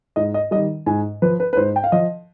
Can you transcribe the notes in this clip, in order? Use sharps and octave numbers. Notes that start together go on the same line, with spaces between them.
G#2 D#5
D#5
D#3 G3 D#5
G#2 G#5
F3 B4
B4
B4
G#2 C5
G5
F5
F3 D#5